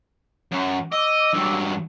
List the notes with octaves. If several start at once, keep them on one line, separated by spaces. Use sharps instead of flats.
F#2
D#5 D6 E6
G2 F#3